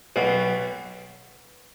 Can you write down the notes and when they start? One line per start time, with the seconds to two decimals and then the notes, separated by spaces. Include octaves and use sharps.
0.16 B1 B2